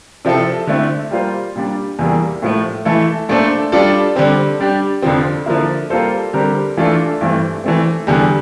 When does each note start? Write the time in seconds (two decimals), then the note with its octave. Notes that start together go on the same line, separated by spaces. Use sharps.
0.25 C3 F3 C4 E4 A4
0.67 D3 A3 C4 E4
1.11 G3 A#3 F4 C5
1.56 A#2 G3 D4
1.99 E2 E3 G3 A#3
2.42 A2 F3 A3
2.85 E3 A3 E4 A4
3.29 A#2 A3 D4 A4 C5
3.72 G3 D4 F4 A4 D5
4.16 D3 G3 C4
4.60 G3 D4 G4
5.02 F2 D3 F3 C4
5.46 D3 F3 A#3 E4
5.90 G3 A#3 F4 A4 C5
6.33 D3 G3 C4 G4 A#4
6.77 E3 A3 D4 F4 A4
7.21 G2 E3 A3 C4
7.64 E3 A3 C4
8.07 E2 D3 G3